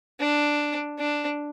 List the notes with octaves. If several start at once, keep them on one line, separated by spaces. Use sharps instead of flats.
D4
D4